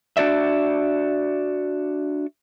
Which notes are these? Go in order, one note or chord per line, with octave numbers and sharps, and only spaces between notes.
D4 F#4 D5 E5